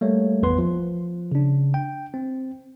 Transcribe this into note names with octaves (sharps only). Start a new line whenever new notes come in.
G3 A3 A#3 C#5
G#1 E2 B3 B4 C6
F3
C#3 D4
G5
C4